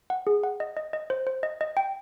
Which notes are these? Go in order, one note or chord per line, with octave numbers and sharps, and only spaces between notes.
F#5
G#4
F#5
D#5
D#5
D#5
C5
C5
D#5
D#5
G5